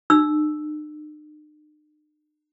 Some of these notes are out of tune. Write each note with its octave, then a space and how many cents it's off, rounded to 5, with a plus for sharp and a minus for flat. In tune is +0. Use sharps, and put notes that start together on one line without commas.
D#4 -45 E6 +0